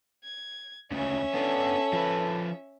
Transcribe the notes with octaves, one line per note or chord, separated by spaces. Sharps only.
G#6
D2 C#3 C#4 E5
B3 D4 A4
F3 B4